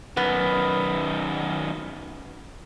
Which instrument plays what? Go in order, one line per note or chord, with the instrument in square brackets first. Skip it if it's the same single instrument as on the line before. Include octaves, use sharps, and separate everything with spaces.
[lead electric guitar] F#2 D#3 [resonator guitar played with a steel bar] B3